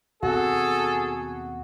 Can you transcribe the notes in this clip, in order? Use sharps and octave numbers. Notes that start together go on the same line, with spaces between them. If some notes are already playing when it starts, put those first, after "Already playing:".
D#2 B2 C4 F#4 G#4 A4